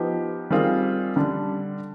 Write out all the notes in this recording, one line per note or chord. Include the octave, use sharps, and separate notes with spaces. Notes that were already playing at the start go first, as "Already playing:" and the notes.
Already playing: F3 B3 D#4 G4
D#3 G3 C4 F4 G#4
D3 G3 D4